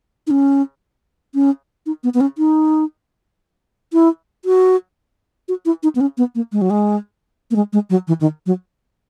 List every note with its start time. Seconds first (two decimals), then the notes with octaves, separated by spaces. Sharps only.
0.27 D#4
0.31 C#4
1.34 C#4
1.86 D#4
2.04 B3
2.14 B3
2.21 C#4
2.38 D#4
3.93 E4
4.45 F#4
5.48 F#4
5.66 E4
5.83 D#4
5.95 B3
6.01 C#4
6.18 B3
6.35 A#3
6.52 G#3
6.61 F#3
6.70 G#3
7.51 A#3
7.56 G#3
7.73 G#3
7.90 F#3
8.08 E3
8.21 D#3
8.46 F#3